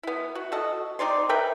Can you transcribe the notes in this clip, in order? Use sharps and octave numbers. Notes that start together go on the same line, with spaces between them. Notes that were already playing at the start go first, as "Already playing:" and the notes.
B3 E4
F#4
F#4 A4 D#5
C4 D#4 D5 C6
A#4 B4 E5 G5